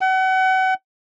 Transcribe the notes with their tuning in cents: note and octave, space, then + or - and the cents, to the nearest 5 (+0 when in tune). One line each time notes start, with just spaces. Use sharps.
F#5 +35